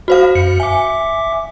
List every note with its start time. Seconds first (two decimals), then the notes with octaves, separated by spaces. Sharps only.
0.08 F#4 C5 F5
0.35 F#2 C#7
0.60 E5 G#5 D6